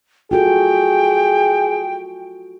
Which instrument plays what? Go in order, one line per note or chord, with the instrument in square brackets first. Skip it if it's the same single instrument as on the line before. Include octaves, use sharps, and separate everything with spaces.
[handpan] F4 F#4 A4 [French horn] G#4 [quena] G5